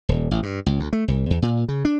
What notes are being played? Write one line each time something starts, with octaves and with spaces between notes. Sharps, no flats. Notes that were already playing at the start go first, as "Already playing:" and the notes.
D#1
A1
G2
C#2
D2
A3
C2
E2
A#2
C#3
D4